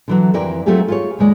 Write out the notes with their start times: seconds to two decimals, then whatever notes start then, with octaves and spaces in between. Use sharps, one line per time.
0.08 D3 E3 F#3
0.34 F2 E3 E4 A#4 D5 G5
0.66 F#3 A3 C4 F4 G4 G#4
0.88 F4 G#4 C#5
1.19 D#2 C#3 G#3 D5